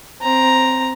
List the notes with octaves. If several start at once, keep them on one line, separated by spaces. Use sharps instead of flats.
C4 A#5